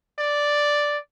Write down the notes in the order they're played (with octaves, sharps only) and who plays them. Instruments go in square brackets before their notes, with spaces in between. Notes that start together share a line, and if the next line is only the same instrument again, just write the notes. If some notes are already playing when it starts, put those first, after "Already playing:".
[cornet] D5